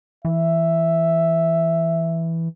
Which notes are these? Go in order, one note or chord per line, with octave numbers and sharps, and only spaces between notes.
E3 E5